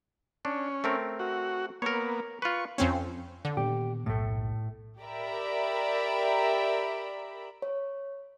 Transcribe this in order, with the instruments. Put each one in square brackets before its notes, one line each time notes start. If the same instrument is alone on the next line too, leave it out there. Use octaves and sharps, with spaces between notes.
[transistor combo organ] C#4 [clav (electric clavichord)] D4
[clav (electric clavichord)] A3 C4 A#4
[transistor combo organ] F#4
[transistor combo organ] A#3 B3 [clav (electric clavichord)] A#4 C#5
[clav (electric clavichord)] F4 B4 [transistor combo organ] C#6
[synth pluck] F2 C4 C#4
D3
[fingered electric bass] A#2 D#3 B3 [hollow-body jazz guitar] G4
[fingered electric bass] F#1 B1 [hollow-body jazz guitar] A2 A3
[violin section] G4 A#4 D5 E5 A#5 B5
[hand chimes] C#5